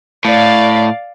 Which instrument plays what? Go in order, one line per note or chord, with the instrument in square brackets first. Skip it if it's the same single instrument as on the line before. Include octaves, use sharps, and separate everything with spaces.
[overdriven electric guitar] A2 [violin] D5 F5